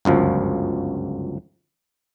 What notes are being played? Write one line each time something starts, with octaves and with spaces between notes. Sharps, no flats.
G1 C#2 F#2 F3